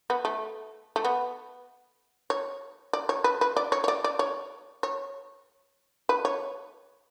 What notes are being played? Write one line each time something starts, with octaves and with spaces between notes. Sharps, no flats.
B3
A3
A3
B3
C#5
D5
C#5
B4
B4
D5
C#5
C#5
D5
D5
C#5
C#5
B4
C#5